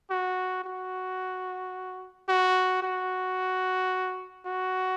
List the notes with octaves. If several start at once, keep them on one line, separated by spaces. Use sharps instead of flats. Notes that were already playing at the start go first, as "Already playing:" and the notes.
F#4
F#4
F#4
F#4
F#4